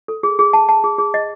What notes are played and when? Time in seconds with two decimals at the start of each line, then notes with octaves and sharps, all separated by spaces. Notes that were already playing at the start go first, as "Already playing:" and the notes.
0.08 A4
0.23 G#4
0.39 G#4
0.53 A5
0.69 A5
0.84 G#4
0.98 G#4
1.14 D#5